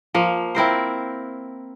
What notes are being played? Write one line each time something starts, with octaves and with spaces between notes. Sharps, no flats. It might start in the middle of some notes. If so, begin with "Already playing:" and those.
F3 A#3
C4 E4 A#4 C5